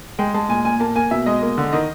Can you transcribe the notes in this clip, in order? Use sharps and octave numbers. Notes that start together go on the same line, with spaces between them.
G#3 G5
G#3 A5
A#2 G#5
A#2 G#5
A#3 A5
A#3 G#5
B2 E5
G#3 D#5
A#3
D3
D#3 D#5